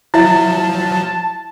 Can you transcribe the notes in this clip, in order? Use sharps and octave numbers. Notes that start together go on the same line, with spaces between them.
F3 F#3 E4 E5 A5